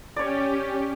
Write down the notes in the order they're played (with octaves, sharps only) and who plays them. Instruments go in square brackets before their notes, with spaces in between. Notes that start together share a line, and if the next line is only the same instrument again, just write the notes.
[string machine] C#4 G4 [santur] C#5 D5